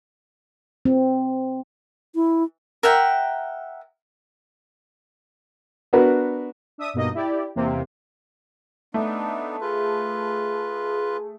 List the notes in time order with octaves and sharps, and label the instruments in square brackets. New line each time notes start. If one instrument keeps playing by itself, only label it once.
[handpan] C4
[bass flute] E4
[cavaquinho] A#4 E5 F#5 G5
[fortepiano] B3 D4 F#4 A#4 B4
[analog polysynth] D4 E5 D#6
G2 B2 A#3 D#4 D#5
E4 G4 D5
E2 C3 A#3 C4
[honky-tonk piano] A3 [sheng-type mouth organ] B3 D4 D#4
[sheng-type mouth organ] F4 B4 [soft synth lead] G#4